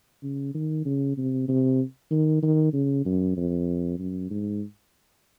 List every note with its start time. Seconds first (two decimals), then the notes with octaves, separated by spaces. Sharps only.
0.23 C#3
0.55 D#3
0.85 C#3
1.17 C3
1.48 C3
2.11 D#3
2.42 D#3
2.73 C#3
3.05 F#2
3.37 F2
3.99 F#2
4.30 G#2